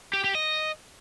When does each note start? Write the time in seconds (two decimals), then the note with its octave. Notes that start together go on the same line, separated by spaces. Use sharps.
0.13 G4
0.24 G4
0.35 D#5